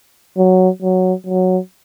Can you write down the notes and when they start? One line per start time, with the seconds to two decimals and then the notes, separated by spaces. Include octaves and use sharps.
0.37 F#3
0.82 F#3
1.26 F#3